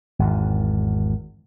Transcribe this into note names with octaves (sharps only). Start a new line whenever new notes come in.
G#1 E2